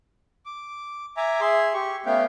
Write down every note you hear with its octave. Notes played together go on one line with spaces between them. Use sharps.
D6
E5 G#5 A#5 D6
G#4 E5 C6
G4 C#6
A3 B3 C#4 F5 G5